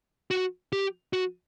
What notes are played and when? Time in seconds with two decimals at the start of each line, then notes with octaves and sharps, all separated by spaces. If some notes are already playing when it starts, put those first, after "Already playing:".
0.31 F#4
0.73 G4
1.13 F#4